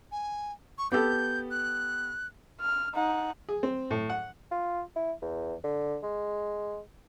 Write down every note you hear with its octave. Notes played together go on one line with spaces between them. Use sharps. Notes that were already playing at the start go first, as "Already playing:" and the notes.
G#5
C#6
B3 G4 A4 G6
F#6
F6
D#4 F#5
G#4
C4
A2
F#5
F4
E4
E2
D3
G#3